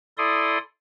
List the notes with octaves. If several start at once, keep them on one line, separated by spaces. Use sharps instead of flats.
E4 A4 D5 C6 D#6